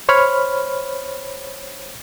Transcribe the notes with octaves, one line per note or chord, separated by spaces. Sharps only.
C5 C#5 B5 F6